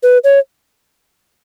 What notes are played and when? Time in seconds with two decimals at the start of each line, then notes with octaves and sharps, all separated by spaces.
0.03 B4
0.24 C#5